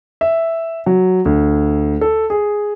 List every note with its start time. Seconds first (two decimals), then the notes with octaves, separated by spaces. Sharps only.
0.21 E5
0.86 F#3
1.25 D2
2.01 A4
2.30 G#4